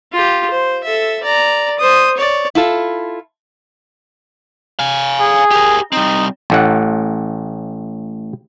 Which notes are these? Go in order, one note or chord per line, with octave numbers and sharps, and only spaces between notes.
F4 G4
C5
A4 E5
D5 A#5
C5 D#6
C#5 D5
E4 F4 A4
F5 G#5
G#4
G4 A#4
G3 C4 D#4
A1 A2 F#5